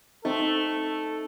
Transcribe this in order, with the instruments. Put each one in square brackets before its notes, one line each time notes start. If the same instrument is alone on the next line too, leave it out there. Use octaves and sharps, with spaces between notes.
[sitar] A3 [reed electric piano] C4 D#4 [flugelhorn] A4